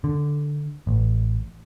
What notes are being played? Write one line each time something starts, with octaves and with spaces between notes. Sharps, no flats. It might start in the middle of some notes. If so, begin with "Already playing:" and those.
D3
A1